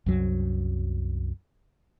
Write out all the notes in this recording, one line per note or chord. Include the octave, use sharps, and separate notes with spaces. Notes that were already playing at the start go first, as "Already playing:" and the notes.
C2 F#2 F#3